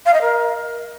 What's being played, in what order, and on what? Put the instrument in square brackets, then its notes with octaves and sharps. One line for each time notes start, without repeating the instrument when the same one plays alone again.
[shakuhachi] F5
D#5
A#4